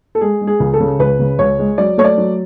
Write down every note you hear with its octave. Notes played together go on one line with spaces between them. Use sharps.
A4
G#3 G#4
G#3
G#4
C#2
A4
C#3
C#2 B4
C#3
C#2 C#5
G#3
F#3 D5
A3 C#5
D5
F#3